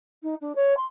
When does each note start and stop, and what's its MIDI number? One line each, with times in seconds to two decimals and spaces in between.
0.23 0.34 63
0.41 0.55 62
0.55 0.76 73
0.77 0.85 84